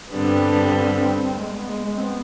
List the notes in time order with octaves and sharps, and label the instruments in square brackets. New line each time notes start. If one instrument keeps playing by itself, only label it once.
[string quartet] G2 D3 G3 B3 [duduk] C4
[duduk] G#3
B3
G#3
G#3
C4
B3